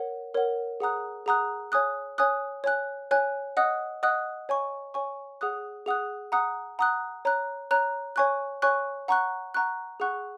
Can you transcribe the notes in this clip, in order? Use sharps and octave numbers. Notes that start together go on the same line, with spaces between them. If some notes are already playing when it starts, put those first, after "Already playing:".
Already playing: A#4 C#5 F#5
A#4 C#5 F#5
G#4 F#5 A#5 D#6 F#6
G#4 F#5 A#5 D#6 F#6
C#5 G#5 D#6 F#6
C#5 G#5 D#6 F#6
C#5 G#5 F#6
C#5 G#5 F#6
D#5 F#5 D#6 F#6
D#5 F#5 D#6 F#6
C#5 G#5 C#6
C#5 G#5 C#6
G#4 F#5 D#6 F#6
G#4 F#5 D#6 F#6
F#5 A#5 D#6 F#6
F#5 A#5 D#6 F#6
C#5 A#5 F#6
C#5 A#5 F#6
C#5 G#5 C#6 F#6
C#5 G#5 C#6 F#6
F#5 A#5 C#6 F#6
F#5 A#5 C#6 F#6
G#4 F#5 C#6 F#6